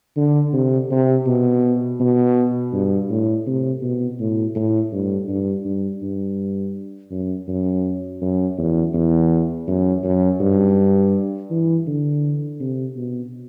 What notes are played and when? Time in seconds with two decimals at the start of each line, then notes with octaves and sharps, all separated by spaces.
0.16 D3
0.53 C3
0.91 C3
1.26 B2
2.00 B2
2.73 G2
3.10 A2
3.47 C3
3.82 B2
4.20 A2
4.55 A2
4.92 G2
5.28 G2
5.65 G2
6.02 G2
7.11 F#2
7.48 F#2
8.21 F#2
8.57 E2
8.94 E2
9.67 F#2
10.03 F#2
10.40 G2
11.50 E3
11.87 D3
12.60 C3
12.96 B2